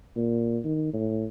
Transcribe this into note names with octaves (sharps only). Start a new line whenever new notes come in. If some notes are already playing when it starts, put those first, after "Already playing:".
A#2
D#3
A2